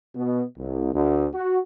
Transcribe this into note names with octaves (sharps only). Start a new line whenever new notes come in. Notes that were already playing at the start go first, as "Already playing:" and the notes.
B2
C2
D2
F#4